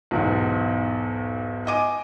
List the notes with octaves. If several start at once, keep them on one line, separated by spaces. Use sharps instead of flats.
B1 E2 G#2
D#5 G#5 D6 D#7